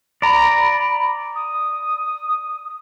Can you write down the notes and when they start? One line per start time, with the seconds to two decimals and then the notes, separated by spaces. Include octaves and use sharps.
0.22 D5 A#5 B5
1.35 D#6